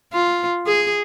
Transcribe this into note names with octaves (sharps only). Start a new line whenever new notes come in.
F4
G#4